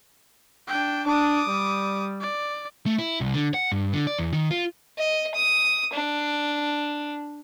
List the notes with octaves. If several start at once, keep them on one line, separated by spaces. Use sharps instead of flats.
D4 G5
D4 D6 D#6
G3
D5
A3
E4
C2
D3
F#5
G2
D3
D5
E2
D#3
F4
D#5
D#6
D4